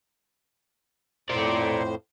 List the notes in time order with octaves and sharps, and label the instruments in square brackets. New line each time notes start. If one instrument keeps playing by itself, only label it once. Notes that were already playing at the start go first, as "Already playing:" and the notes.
[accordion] F2 A2 C5 [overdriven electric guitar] A#4 D5